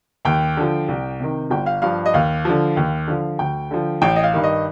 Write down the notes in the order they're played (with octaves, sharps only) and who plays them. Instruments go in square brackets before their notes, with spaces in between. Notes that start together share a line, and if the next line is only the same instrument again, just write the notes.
[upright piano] D#2 G5
D3 F3
C2
C3 D#3
G1 G5
F5
G2 F3 F5
D#5
D#2 F5
D3 F3
D#2
D3 F3
D2 G5
D3 F3
A1 G5
D#5
F5
G2 D#3
D#5